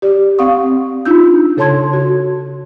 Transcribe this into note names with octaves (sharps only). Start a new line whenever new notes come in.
G4 D5
C4 F5 F#5 C#6 D#6
D4 D#4 F4 E6 G6
C#3 A4 C#5 A5 C6 G#6
F#4